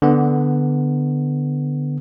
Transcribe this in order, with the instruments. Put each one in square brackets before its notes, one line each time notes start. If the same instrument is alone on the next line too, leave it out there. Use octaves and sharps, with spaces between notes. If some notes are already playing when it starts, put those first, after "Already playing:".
[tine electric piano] D3 B3